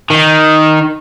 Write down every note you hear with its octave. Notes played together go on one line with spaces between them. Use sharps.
D#3